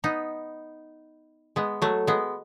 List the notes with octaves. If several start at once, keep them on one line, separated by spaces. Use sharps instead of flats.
B3 D#4
G#3 B3
F#3 A3
G#3 B3